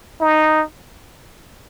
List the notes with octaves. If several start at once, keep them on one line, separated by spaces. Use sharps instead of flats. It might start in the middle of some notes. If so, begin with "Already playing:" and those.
D#4